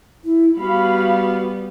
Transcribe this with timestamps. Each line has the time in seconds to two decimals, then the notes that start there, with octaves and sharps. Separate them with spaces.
0.24 E4
0.58 G3 B3 F#4 F5 B5